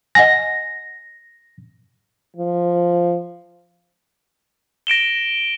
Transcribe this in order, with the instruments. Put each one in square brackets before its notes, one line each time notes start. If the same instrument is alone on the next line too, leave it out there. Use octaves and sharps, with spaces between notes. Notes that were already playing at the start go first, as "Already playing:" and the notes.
[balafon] D#5 F#5 G#5 [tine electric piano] A#6
[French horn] F3
[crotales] A#6 D7 E7 G7